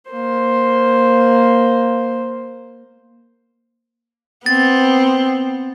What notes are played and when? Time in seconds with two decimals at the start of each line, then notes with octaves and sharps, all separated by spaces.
0.11 A#3 C5
4.46 B3 C4 A6